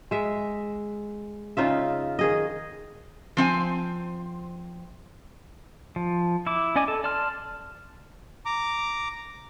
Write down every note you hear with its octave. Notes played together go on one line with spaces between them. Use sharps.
G#3 E5
C#3 D#4 F4 E5
D#3 G#4 D#5
F3 C4 F#5 G#5
F3
E4 D6
C#4 D5 D#5 G#5 D6
A4
D5 A5 C6 F6
A#5 D6